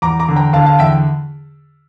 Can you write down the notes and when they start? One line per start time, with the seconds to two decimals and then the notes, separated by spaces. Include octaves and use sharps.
0.02 E2 A#5 D6
0.19 A#5 D6
0.28 D3
0.36 G5 A#5
0.53 D3 F5 A5
0.66 F5 A5
0.79 E2 E5 G5